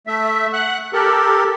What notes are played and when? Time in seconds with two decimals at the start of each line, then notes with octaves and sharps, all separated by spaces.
0.07 A3 E5
0.53 F#5 F#6
0.93 G4 A4 A#4